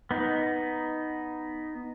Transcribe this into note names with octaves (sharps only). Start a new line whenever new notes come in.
B3 D#4